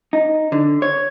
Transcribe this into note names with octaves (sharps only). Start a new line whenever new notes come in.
D#4
D3
C#5